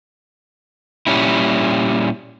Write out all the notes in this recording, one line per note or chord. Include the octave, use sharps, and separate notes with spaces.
A#2 G3 C#4 E4